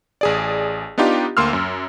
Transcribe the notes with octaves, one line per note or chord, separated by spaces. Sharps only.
A1 G#4 D5
B3 D4 D#4 F4 G4
D2 A#3 C6 E6 F6
F#2